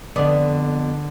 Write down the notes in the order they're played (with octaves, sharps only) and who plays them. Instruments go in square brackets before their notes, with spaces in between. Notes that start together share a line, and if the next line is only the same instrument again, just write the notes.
[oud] F2 B3 D5 [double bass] D3